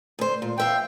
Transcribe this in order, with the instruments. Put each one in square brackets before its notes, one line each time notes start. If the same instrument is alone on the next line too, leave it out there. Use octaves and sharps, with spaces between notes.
[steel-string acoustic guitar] D2 C5
A#2
[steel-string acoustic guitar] E2 E5 F5 [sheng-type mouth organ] G5